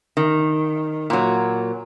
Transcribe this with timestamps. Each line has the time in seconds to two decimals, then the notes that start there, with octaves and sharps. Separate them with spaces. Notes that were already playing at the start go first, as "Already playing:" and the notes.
0.17 D#3
1.10 A#2 F#3